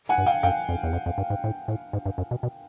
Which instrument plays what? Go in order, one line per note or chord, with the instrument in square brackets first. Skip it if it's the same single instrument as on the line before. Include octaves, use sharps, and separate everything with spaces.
[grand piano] F#5 G#5
[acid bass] G2
[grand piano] F5 G5
[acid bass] F#2 [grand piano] F5 G5
[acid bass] F2
E2
F2
F2
G2
G#2
A2
A2
G#2
G2
F#2
B2
B2